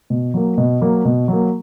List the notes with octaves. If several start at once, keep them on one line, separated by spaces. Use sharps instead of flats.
B2
F#3 A#3
B2
F#3 A#3
B2
F#3 A#3